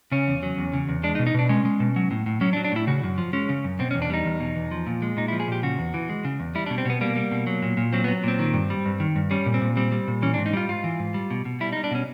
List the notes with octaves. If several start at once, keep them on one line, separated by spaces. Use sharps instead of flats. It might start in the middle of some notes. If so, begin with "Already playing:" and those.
C#3 C#4
E2
F#3
E2
C#3
E2
G#3 D4
D#4
B2
D#4
B2 D4
G#3 C#4
G#3
B2
F#3
A2
A2
F#3 C#4
D4
F#3
D4
A2 E4
C#3 F#4
F#2
F3
G#3 C#4
C#3
F#2
B2 C4
C#4
E2
D4
G3 D#4
E2
B2
E2
F3
A#2
G#3
A#2 D#4
E4
F3
G#4
A#2 G4
C#3 F#4
E2
E3
G#3
C#3
E2
G3 E4
D4
B2
C4
B2 B3
G3 A#3
G3
B2
F#3
A#2
A#2
F#3 C4
B3
F#3
A#2 C4
D#3
G2
G3
G2
D#3
G2
G3 C#4
A#2
C4
A#2
G3 C4
G3
A#2
E3 C#4
D4
G#2
D#4
G3 F4
G#2 F4
E3
G#2
G3
B2
B2
G3 E4
D#4
G3
D4
B2 C#4